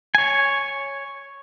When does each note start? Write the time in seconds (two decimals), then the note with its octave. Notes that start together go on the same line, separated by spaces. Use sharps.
0.15 C#5 G#5